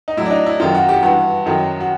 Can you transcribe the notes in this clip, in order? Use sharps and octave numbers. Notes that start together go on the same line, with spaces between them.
D#4
A2 F#3 E4
D4
D#4
E4
F#2 D#3 F#3 F4
F#4
G4
G2 E3 F#4
F#2 D#3 F#3
F#4